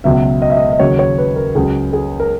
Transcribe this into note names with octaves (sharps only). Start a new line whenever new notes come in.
C#2 B2 F#3 E5
D#5
E5
D#5
D#5
D#2 C#3 F#3 C#5
C#5
B4
A#4
C#2 C#3 F#3 G#4
G#4
A#4